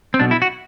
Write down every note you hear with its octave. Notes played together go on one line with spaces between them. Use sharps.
C4
B1 B2 D4
E4
F#4